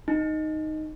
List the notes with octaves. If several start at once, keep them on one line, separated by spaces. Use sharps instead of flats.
D#4